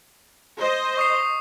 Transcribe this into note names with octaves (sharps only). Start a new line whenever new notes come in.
C5 D#5
C#6 D#6 C7